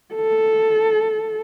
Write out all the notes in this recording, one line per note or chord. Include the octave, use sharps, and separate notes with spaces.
A4